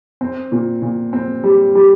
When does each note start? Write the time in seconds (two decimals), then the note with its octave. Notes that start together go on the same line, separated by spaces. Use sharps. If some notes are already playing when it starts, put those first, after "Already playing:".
0.21 C4
0.52 A#2
0.82 A#2
1.13 C4
1.44 G3
1.75 G3